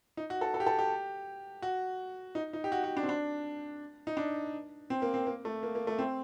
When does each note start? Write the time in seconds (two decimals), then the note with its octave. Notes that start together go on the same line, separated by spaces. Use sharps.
0.17 D#4
0.30 F#4
0.41 A4
0.54 A4
0.60 G4
0.67 A4
0.79 G4
1.62 F#4
2.35 D#4
2.53 D#4
2.64 G4
2.72 F#4
2.84 F#4
2.97 D4
3.03 C4
3.09 D4
4.07 D#4
4.17 D4
4.90 C4
5.02 A#3
5.14 C4
5.26 A#3
5.45 A3
5.63 A#3
5.75 A#3
5.87 A3
5.99 C4